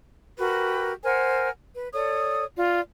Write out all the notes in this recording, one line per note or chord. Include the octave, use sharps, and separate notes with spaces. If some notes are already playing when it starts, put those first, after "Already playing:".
F#4 G4 A#4 B4
A#4 C5 F#5 G#5
B4
A4 C#5 D5 D#6
F4 D5